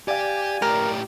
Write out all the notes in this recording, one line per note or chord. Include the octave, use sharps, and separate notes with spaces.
G4 D5 F5 G#5
A2 G4 A#4